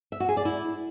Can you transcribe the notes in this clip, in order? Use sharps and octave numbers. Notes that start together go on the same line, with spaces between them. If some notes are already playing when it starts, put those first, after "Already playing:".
E5
F#4
G#4
D5
E4